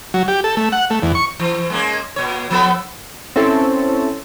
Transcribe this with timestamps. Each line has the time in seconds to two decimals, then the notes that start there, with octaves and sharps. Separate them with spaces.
0.14 F#3
0.28 G4
0.44 A4
0.57 A3
0.72 F#5
0.90 A3
1.03 E2
1.15 C#6
1.39 E3
1.70 G#3 A#3 C#4
2.16 A#2 C#5
2.50 F3 B3 A4
3.36 C4 C#4 E4 A4